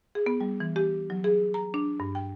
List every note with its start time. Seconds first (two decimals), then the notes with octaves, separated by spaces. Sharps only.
0.15 G#4
0.26 B3
0.40 G3
0.60 E3
0.76 G4
1.10 F#3
1.24 G#4
1.54 A#5
1.74 D4
2.00 G2
2.15 G5